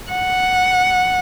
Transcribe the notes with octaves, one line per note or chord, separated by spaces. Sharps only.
F#5